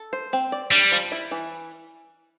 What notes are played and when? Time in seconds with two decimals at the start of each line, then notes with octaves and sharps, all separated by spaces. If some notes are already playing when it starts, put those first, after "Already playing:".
Already playing: A4
0.13 C5
0.33 C4
0.52 D5
0.71 G3 D4
0.92 F3
1.12 E4
1.31 E3